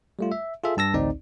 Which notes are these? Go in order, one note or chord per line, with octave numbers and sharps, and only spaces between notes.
G3 A3 F4
E5
F4 G#4 A4 E5
G2 A5 E6 A#6
A1 D2 C4 D#4 D5